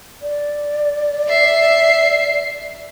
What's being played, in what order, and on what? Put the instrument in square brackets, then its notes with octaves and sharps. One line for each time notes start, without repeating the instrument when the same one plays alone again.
[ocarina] D5
[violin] E5 C7